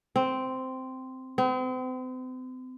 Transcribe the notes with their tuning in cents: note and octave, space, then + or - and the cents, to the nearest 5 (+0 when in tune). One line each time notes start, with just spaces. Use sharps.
C4 -10
C4 -40